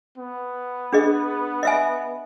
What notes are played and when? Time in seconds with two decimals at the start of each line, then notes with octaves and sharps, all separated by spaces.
0.18 B3
0.93 D4 G#4 D#5
1.63 D#5 E5 G#5